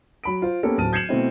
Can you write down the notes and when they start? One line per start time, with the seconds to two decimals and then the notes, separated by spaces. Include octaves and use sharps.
0.24 F#3 B5 D7
0.42 F4 C5
0.63 A#3 B3 C#4 G4 A4
0.78 D1 A5 F6 D#7
0.93 G6 G#6 C7 C#7 E7 F#7
1.09 B2 A3 C4 E4